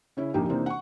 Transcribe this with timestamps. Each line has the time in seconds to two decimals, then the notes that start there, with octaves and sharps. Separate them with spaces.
0.17 C#3 C#4 E4
0.34 A#1 F2 A#3 D#4 G4 G5
0.49 C3 E3 A#3 C4 D4 D#4
0.66 F#5 C#6